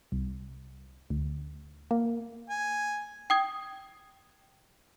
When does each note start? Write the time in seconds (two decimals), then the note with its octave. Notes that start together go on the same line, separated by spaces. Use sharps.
0.12 C2
1.10 D2
1.91 A#3
2.49 G#5
3.30 G5 D#6 G#6